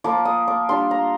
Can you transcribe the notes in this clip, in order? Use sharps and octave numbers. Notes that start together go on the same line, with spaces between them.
F3 A#3 F4 D6
D#6
D6
G3 D4 F4 C6
A#5